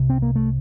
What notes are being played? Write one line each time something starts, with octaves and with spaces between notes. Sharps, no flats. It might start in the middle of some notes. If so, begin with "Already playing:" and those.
Already playing: C2 C3
C4
A#3
A3